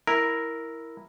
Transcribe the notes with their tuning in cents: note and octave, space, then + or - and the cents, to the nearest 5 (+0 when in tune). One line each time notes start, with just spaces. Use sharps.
E4 +0 A#4 +0